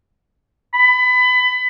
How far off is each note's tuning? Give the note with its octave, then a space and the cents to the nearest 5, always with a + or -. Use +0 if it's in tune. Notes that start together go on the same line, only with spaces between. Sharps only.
B5 +25